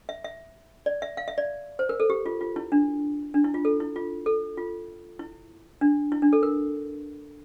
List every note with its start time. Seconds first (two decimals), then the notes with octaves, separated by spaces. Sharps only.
0.09 E5
0.24 E5
0.86 D5
1.02 E5
1.17 F5
1.28 E5
1.38 D5
1.79 C5
1.89 A#4
2.00 A4
2.10 G4
2.26 F4
2.41 F4
2.56 E4
2.72 D4
3.34 D4
3.44 E4
3.54 F4
3.65 A4
3.80 E4
3.96 F4
4.26 A4
4.57 F4
5.19 E4
5.81 D4
6.12 E4
6.22 D4
6.33 A4
6.43 A#4